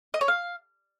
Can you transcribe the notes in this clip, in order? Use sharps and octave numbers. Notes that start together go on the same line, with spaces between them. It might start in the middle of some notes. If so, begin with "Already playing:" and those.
D#5
C#5
F5